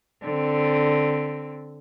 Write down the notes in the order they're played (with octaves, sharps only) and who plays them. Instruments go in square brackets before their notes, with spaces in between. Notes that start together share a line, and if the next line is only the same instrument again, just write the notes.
[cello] D3 C4